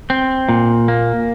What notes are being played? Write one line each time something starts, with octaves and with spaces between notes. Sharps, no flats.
C4
A#2
A#3